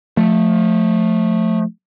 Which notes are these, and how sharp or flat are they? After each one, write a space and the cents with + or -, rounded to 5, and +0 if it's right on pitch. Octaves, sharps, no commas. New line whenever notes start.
F3 +25 A3 +0